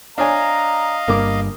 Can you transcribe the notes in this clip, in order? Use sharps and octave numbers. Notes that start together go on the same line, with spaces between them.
D4 C#5 D#5 F5 G#5 A#5
G1 G2 A#3 D6